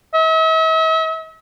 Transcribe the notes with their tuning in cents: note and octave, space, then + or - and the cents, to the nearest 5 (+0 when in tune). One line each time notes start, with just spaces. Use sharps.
E5 -45